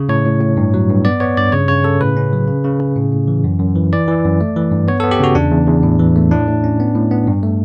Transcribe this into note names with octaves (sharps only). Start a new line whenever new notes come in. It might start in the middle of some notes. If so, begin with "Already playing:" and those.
Already playing: C#3
A2 C#5
A2
A2
G2
F#3
G2
B3 D5
B3 C#5
G2 D5
C#3 C#5
C#3 C#5
C#3 A4
A2 B4
C#4
F#3
C#3
C#3
C#3
A2
A2
E3
F#2
F#2
E3
E3 D5
E3
F#2
A3
E3
G2
B3 C#5
A4
B3
G4
C#3 F#4
E2 D4
E2
E2
A2
E3
A3
A2 D4
A2
C#4
B3
A2
B3
G2
A3